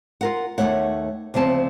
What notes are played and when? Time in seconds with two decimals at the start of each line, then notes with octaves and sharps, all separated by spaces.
0.21 F4 A#4 F#5
0.58 D#2 G#2 A3 C#5 F#5
1.34 D2 C#3 F3 C4 A5